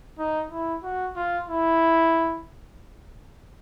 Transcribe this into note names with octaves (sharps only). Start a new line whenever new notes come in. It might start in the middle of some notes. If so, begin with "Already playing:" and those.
D#4
E4
F#4
F4
E4